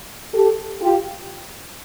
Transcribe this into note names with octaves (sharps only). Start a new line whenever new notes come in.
G4 A4
F4 G4